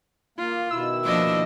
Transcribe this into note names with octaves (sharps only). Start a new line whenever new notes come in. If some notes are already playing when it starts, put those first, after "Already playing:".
A#3 F4
B2 D#3 E4 E6
F3 A#3 D4 D#5